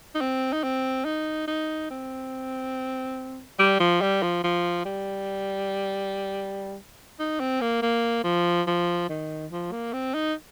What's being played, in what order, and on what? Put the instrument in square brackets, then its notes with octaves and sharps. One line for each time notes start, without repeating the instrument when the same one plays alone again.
[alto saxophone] D#4
C4
D#4
C4
D#4
D#4
C4
G3
F3
G3
F3
F3
G3
D#4
C4
A#3
A#3
F3
F3
D#3
F3
A#3
C4
D#4